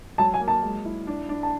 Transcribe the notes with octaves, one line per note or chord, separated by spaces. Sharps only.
F#3 A5
G#5
A#3
A5
G#3
E4
D4
D4
A5